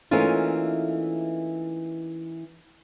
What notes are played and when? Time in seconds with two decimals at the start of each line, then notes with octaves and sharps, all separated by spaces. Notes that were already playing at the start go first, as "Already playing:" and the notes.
0.11 E3 A3 A#3 C#4 D#4 F4